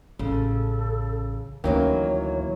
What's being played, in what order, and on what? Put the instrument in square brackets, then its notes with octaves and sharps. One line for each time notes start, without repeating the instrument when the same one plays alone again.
[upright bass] A1 [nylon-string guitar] C#3 [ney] A4
[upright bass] D2 [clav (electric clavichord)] D#3 A#3 G5 [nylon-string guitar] E3 F#3 C#4 [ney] C#5